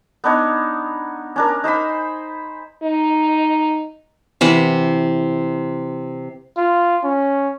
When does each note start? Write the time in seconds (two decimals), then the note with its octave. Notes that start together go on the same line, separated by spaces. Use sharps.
0.24 B3 D4 D#4 C#5
1.36 C#4 D4 A#4
1.64 D#4 C5 G#5 B5
2.83 D#4
4.41 C3 E3 B4 F#5
6.57 F4
7.04 C#4